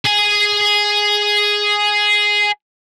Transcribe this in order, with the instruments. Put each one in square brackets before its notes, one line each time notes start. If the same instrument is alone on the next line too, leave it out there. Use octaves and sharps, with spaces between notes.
[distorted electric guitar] G#4 G#5